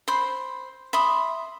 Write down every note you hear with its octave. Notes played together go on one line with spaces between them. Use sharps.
C5 B5 C6
E5 B5 C6 D#6